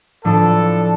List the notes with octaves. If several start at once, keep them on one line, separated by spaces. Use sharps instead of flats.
A2 F3 D4 A4